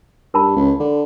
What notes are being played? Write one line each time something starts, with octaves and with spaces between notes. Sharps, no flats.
G2 A#4 A5 B5
C#2
D3